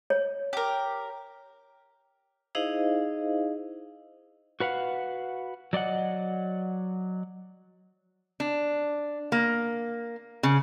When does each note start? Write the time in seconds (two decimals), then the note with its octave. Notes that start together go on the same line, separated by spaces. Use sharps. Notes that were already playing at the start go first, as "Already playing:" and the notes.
0.10 C#5
0.53 G4 A#4
2.55 D#4 E4 G#4 C5 D#5 F5
4.60 F#4 B4 F5 F#5
5.73 F#3 D5 D#5 F#5
8.40 D4
9.32 A#3
10.43 C#3